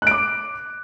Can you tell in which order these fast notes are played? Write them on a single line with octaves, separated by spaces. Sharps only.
F#6 D7 D6